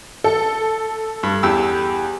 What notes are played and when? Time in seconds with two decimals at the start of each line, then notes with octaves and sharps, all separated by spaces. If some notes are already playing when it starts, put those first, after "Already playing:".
0.24 A4
1.23 G2
1.43 E2 G4 E6